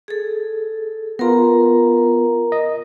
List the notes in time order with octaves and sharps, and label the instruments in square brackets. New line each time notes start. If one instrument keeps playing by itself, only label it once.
[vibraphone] G#4 A4
[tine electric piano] B3 F4 [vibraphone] A#4 A#5
[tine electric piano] D#5